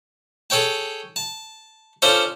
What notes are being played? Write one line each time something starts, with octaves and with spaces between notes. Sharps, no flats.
G#4 A4 C#5 G5 A5
A5
C#4 D4 F4 A4 C5 C#5